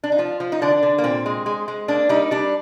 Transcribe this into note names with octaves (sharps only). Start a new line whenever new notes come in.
D4
D#4
F3 F4
F3
D#4
D3 D4
D3
A#3
A#2 C4
G#3
G#3
G#3
A#3 D4
G3 D#4
G3 D4